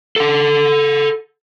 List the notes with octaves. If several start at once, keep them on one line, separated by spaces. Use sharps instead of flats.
A4 F#5